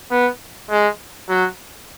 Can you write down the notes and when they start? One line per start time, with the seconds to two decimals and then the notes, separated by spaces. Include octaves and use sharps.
0.11 B3
0.70 G#3
1.29 F#3